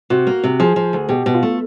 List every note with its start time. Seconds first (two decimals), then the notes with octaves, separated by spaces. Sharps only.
0.10 C3 F#4
0.27 A#3
0.44 C3
0.60 F3 G#4
0.76 F3
0.93 D2
1.09 B2 G4
1.26 B2
1.34 F4
1.43 A3